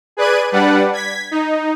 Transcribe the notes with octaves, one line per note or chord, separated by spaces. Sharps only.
G#4 B4 D5 F#6 G#6 D#7
G3 D4 B4 D5 F#5
G#6 B6
D#4